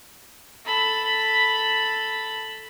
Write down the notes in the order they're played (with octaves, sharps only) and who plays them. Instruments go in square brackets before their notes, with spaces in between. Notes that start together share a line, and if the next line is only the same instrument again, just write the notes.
[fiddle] A4 B5